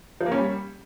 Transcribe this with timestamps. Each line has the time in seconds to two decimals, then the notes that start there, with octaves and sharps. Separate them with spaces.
0.21 F3
0.26 A#3
0.32 C#4
0.37 G3